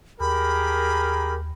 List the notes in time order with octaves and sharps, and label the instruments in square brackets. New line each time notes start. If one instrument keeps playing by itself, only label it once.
[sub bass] D#2 [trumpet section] G4 G#4 A#4 [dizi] B5